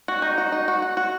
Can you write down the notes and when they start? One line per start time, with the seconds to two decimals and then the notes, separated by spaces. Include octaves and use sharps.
0.08 F#4
0.22 D#4
0.38 F#4
0.52 D#4
0.68 F#4
0.82 F#4
0.97 F#4